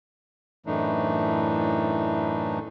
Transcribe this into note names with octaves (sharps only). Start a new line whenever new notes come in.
F#2 A2 E3 A3 D4 D#4